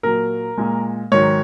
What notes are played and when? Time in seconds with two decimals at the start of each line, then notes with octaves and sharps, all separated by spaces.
0.03 A#2 F#3 A#4
0.58 A#2 G#3
1.12 G#2 D#3 F#3 C#5